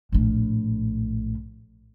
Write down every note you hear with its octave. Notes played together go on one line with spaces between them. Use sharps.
A#1 A2